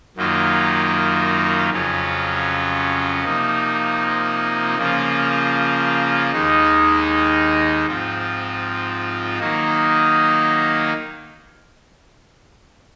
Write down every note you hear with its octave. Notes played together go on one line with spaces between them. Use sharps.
F#2 D#3 F#3 A#3 F4
F2 C#3 F#3 C#4 F4
C3 F3 A#3 D#4
C#3 F3 A#3 F4
D#2 D#3 G#3 D#4
G#2 F3 C4 F4
D#3 F#3 A#3 D#4